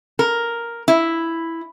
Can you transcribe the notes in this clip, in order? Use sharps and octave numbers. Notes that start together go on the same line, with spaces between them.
A#4
E4